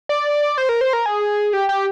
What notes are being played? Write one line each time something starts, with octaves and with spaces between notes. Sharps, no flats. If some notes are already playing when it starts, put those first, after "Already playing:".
D5
C5
A#4
C5
A#4
G#4
G4
G4